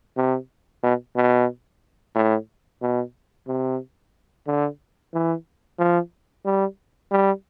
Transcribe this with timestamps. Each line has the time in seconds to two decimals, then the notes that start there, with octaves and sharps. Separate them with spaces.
0.17 C3
0.83 B2
1.16 B2
2.15 A2
2.82 B2
3.48 C3
4.47 D3
5.14 E3
5.79 F3
6.45 G3
7.11 G3